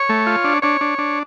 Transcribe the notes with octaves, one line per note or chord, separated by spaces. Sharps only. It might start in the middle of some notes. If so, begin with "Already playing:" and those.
Already playing: C#5
A3
F4
D4
D4 C#5
D4
D4